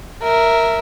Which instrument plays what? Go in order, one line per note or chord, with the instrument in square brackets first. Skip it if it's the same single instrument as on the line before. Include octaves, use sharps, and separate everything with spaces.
[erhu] A#4 [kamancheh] E5